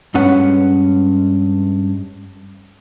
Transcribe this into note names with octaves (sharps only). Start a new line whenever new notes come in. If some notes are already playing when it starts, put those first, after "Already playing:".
G2 G#3 C#4 B4 F#5